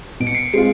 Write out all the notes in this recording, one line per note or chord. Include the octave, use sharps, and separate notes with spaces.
B2 D7
C#7
C7 D7
G#3 C4 F4 C7 D7